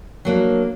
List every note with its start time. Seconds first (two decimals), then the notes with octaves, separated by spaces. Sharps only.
0.25 F#3 A#3 D4